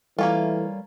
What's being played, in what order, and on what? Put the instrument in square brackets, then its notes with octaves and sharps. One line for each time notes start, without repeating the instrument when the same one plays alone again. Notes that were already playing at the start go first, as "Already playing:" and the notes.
[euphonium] E3 [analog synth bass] G3 [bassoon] A3 [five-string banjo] A#3 C#4 F4